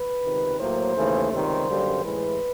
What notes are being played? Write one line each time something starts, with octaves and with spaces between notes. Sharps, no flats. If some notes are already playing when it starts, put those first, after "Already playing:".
Already playing: B4
C#2 C3 D#3
A2 F#3 A#3 C5
D#2 C#3 E3 A3
C#2 C3 D#3 G3 C5
F#2 D3 G3 A#3
A2 E3 G#3 B4